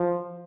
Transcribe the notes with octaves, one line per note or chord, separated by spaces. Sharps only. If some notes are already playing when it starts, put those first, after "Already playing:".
Already playing: F3